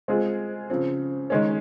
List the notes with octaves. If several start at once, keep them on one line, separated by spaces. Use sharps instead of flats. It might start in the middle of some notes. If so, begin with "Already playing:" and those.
G#3 C4 F4 G#4
C#3 F3 C4
D#3 G#3 C#4